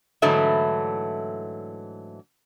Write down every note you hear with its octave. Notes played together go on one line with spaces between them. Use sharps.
G#2 D3 E3 F#3 A3 E4